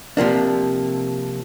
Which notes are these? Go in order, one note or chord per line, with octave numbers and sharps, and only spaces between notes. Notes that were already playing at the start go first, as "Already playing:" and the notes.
C3 F3 A#3 D4